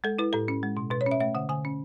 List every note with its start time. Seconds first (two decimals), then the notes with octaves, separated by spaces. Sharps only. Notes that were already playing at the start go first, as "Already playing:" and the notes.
0.04 G#3 A4
0.19 E4 B4
0.33 A2 A4
0.48 C#4
0.63 G#3
0.77 B2
0.91 B2 B4
1.01 C#5
1.07 C#4 E5
1.20 A3 E5
1.35 D3 F#5
1.49 D3 G#5
1.65 C#4